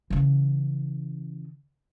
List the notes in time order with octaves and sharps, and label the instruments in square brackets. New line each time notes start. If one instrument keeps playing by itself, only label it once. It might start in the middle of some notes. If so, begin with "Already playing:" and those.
[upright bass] C#3 E3